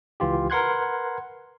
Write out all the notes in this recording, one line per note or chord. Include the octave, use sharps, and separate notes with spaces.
C#2 E3 F4 G4
A#4 B4 F#5 C6 F#6 G#6